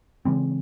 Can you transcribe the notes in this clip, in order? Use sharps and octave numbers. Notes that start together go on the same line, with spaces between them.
C#3 E3 G#3 C4